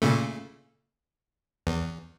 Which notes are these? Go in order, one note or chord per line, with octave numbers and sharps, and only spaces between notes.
A#2 C#3 A3
E2